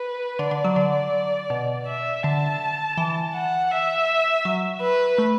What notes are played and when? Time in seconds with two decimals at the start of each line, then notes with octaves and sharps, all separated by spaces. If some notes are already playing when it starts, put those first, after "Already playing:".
Already playing: B4
0.39 D3 D5
0.51 D3
0.65 F#3
0.76 D3
1.50 B2
1.87 E5
2.24 D3 A5
2.98 E3
3.34 F#5
3.71 E5
4.45 F#3
4.82 B4
5.18 A3